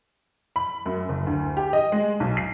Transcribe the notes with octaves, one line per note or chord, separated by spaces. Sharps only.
B5
F#2
F#1
D2
G4
D#5
G#3
B1
C7